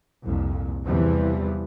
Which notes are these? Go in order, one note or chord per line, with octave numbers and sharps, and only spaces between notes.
C2 F2 A#2
E2 C3 E3 F3 G3